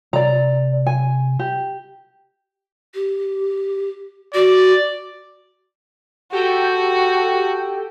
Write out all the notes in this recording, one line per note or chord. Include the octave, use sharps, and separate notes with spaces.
C3 D5 A#5
G#5
G4
G4
F#4 D5
F#4 G4 A4 G5